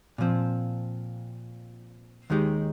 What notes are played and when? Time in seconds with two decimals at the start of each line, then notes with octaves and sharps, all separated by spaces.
0.18 A#2 F3 C4
2.30 D#2 D#3 G#3 D#4 G4